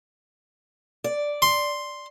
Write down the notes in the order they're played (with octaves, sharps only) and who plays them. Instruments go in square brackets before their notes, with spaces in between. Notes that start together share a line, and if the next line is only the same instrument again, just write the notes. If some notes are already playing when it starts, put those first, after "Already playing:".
[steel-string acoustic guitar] D5
[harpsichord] C6